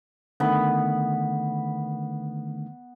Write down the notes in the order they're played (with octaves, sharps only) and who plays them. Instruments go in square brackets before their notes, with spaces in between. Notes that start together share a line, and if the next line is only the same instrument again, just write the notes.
[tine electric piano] D3 D#3 A3 [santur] B3 B5